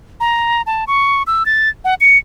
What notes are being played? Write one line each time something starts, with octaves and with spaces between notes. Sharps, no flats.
A#5
A5
C#6
E6
A6
F#5
C#7